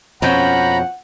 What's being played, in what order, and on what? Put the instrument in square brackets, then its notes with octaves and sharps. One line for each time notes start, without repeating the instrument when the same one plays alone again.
[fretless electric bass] F2 B2 [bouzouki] F3 C#4 G5 [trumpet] F#5 [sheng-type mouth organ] A#5 B5